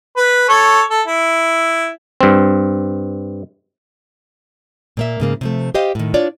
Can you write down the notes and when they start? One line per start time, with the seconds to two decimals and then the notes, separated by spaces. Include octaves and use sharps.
0.16 B4
0.49 A4 C#5
0.90 A4
1.08 E4
2.21 G2 C4
4.97 A#2 A#3 E5
5.20 G#2 C#3 A#3
5.41 C3 F3 A3
5.74 G4 C5 D#5 F5 G5
5.95 A2 D#3
6.14 D4 F4 C#5 D5